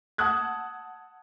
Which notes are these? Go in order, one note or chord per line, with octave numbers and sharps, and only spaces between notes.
F#5 A5 D#6 E6 F#6 G#6